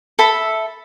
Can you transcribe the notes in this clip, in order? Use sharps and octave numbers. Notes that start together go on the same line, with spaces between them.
A4 E5 B5